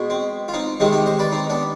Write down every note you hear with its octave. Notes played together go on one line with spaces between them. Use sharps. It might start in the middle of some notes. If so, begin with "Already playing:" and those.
Already playing: B2 G#3
C4
F4
C4 D#4
C3 D#3 G#3 C4 D#4
D#4 G4
C5 D#5
B4 D5
C4 D#4
B3 D4